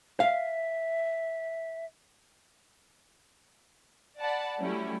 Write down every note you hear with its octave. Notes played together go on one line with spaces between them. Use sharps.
E5 F5
D5 F#5 A5 B5
F#3 G3 A3 C#4 E4